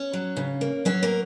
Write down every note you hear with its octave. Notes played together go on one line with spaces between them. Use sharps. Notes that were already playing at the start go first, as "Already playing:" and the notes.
Already playing: C#4 C#5
F#3
C#3
A#3
F#3 C#4 C#5
A#3 A#4